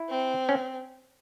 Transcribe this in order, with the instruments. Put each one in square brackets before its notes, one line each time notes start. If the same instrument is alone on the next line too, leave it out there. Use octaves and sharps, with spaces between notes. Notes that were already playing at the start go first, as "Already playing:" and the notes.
Already playing: [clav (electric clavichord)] E4
[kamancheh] C4
[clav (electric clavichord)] C#4